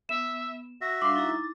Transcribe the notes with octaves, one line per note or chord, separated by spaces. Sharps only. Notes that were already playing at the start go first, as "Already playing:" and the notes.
B3 E5 E7
F#4 E5 A#6
G3 D4 F5 C6 D6
D#4 E4 A#5 A6